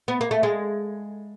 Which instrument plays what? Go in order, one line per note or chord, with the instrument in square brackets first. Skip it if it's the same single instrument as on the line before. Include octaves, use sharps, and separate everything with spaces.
[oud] B3
A#3
A3
G#3